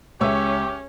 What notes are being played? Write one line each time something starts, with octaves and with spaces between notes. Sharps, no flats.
C#2 C#4 G4 C#5 E5 E6